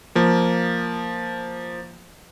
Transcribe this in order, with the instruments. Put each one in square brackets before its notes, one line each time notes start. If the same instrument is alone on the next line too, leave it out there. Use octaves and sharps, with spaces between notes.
[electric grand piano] F3 A#3